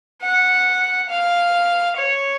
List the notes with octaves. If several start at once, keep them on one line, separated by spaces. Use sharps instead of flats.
F#5
F5
C#5